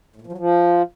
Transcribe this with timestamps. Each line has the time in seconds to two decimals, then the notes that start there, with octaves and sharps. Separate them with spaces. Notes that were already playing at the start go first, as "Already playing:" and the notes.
0.16 A2
0.21 A#2
0.27 F3
0.32 F#3
0.38 F3